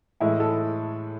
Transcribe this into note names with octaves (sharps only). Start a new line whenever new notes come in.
A2 E3 G#3 E4
A4